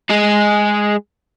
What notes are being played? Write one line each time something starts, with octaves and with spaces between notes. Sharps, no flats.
G#3 G#4